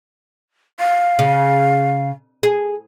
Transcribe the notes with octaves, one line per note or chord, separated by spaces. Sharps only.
F5
C#3
G#4